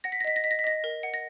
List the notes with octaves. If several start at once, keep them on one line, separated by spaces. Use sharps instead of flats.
F#5 A#6
B6
A#6
D#5 B6
A#6
D#5 B6
A#6
B6
D#5 A#6
A#4
F#5
A#6